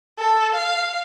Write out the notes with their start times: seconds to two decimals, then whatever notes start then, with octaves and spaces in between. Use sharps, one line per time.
0.19 A4
0.54 F5